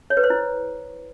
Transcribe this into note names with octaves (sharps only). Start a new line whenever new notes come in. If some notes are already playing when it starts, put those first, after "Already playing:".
C#5
B4
C5
E4